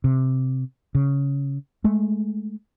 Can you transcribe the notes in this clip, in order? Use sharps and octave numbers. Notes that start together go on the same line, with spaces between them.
C3
C#3
G#3 A3